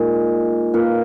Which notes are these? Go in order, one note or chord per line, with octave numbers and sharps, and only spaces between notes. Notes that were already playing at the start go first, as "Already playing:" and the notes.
Already playing: A#2 G#3 D#4
A#3 F4 B4